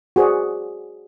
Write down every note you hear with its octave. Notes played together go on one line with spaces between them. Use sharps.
F#4 G#4 C5 D5